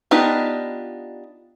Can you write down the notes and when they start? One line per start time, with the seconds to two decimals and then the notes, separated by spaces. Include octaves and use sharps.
0.11 B3 D4 D#4 F4 G4